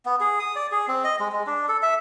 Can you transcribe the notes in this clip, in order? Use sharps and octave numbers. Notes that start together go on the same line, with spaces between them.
B3
G#4
D#6
D5
G#4
C4
D#5
G#3
G#3
D4
A4
E5